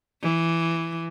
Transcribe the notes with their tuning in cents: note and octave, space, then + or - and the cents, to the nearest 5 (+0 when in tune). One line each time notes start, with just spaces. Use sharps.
E3 +10